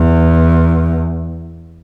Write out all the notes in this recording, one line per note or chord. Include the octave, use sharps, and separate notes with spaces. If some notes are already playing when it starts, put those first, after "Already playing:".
Already playing: E2